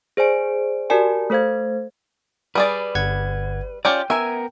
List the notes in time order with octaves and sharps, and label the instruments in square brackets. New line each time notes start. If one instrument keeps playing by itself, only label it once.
[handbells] G#4 C5 D5 G#5 D7
F#4 G4 A#4 D5 G#5 A5
A3 A4 C5 F5 G#6
[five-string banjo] G3 G#4 D5 [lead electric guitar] B4
[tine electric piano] G1 F#5 G#6
[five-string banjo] C#4 F4 G4 [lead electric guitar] D5 [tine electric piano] G5
[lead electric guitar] B3 A#4 [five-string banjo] E5 G#5